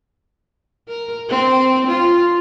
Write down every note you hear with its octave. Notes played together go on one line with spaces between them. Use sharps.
A#4
C4
F4